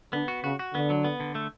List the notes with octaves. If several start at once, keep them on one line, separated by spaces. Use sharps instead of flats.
D3 B3
F#4
C#3 F#4
F#4
D3 B3
F#3
B3
D3
A3